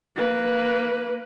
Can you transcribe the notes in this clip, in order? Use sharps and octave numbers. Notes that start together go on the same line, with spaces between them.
A#3 B4